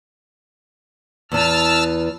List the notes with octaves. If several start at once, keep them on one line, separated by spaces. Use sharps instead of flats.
E2 E3 A5 E6 F6